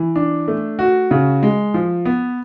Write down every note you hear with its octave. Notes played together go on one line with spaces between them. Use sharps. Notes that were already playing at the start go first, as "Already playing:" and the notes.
Already playing: E3
D4
A3
F#4
C#3
G#3
F3
B3